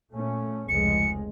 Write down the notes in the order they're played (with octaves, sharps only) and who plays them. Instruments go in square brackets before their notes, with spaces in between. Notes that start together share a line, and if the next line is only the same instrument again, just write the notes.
[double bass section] A#2 A3 C#4
[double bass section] F1 C#2 G#3 [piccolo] C#7